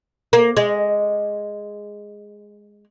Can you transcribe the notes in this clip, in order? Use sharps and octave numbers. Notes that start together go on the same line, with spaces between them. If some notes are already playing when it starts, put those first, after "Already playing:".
A#3
G#3